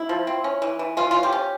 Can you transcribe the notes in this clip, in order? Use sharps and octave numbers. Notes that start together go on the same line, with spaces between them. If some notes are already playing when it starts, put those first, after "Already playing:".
Already playing: E4
F3
C4
C#4
E3
E3
E3 F4
C#4 F4
G4
C#4